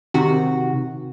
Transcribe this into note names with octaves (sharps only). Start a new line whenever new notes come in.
C3 D#3 F#4